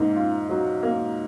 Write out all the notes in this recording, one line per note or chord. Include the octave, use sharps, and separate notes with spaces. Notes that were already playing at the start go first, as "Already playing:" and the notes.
Already playing: G#2 A#3
F4
F#3
A#3